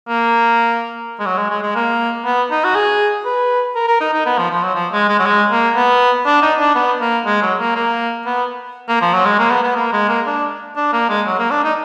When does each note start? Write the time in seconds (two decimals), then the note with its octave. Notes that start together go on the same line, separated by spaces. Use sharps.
0.08 A#3
1.20 G#3
1.26 F#3
1.38 G#3
1.50 G#3
1.63 G#3
1.75 A#3
2.25 B3
2.51 D#4
2.64 F#4
2.75 G#4
3.25 B4
3.75 A#4
3.87 A#4
4.01 D#4
4.13 D#4
4.26 B3
4.38 F3
4.51 F3
4.63 F#3
4.75 F3
4.92 G#3
5.09 G#3
5.19 F#3
5.26 G#3
5.51 A#3
5.76 B3
6.26 D4
6.42 D#4
6.59 D4
6.75 B3
7.01 A#3
7.26 G#3
7.42 F#3
7.60 A#3
7.76 A#3
8.26 B3
8.89 A#3
9.01 F3
9.13 F#3
9.26 G#3
9.39 A#3
9.51 B3
9.63 B3
9.76 A#3
9.93 G#3
10.09 A#3
10.27 D4
10.76 D4
10.93 A#3
11.09 G#3
11.26 F#3
11.39 A#3
11.50 D4
11.64 D#4